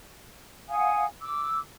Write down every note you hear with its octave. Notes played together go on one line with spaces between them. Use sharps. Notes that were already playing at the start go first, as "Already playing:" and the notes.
F5 F#5 G#5 D#6
D6 E6